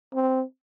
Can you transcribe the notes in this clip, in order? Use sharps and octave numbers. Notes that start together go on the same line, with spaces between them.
C4